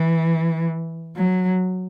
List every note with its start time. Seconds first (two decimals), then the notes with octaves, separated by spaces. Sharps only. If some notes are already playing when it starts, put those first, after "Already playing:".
Already playing: E3
1.17 F#3